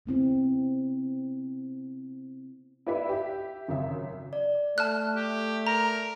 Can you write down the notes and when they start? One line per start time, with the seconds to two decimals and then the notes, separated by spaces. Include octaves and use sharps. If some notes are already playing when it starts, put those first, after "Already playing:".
0.06 C3 B3 C4 E4
2.87 E4 G4 B4 D5 E5 F5
3.09 G4 E5
3.68 G#1 F#2 C#3 E5
4.33 D5
4.78 A3 A5 F6 F#6
5.16 G4
5.67 A#4 A#5